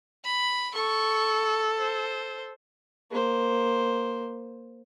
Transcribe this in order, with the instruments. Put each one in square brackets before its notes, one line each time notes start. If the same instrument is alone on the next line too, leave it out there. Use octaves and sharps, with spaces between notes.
[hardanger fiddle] B5
[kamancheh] A4 [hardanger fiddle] C#6
[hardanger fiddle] C5
[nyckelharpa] A#3 C5